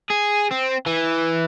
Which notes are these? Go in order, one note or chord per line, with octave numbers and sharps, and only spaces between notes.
G#4
C4
E3